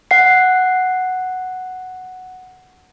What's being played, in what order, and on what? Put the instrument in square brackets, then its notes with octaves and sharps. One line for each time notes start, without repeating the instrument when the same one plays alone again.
[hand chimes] F#5 C7